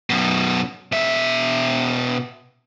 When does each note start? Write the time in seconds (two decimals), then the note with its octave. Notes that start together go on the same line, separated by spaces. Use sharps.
0.10 F#2 B2
0.92 B2 E5